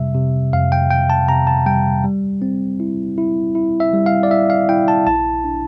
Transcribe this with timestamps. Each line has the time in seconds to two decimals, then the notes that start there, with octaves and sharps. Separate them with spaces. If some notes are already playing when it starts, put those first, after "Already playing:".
Already playing: F2 C3 G3 E5
0.15 C3
0.53 F2 F5
0.72 G5
0.90 F2 G5
1.10 A5
1.29 C3 A#5
1.47 A5
1.66 G3 G5
2.04 G3
2.42 C4
2.80 E4
3.18 E4
3.55 E4
3.80 E5
3.93 G3
4.06 F5
4.23 D5
4.31 E4 E5
4.50 F5
4.69 E4 G5
4.88 A5
5.07 A#1 A5
5.44 D4